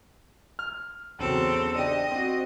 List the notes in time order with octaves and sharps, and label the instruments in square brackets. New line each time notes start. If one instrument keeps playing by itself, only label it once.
[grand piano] F6
[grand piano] E2 C#3 F#3 [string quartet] C4 A4
[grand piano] D4 G4 [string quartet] D#5
[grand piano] C4 F#4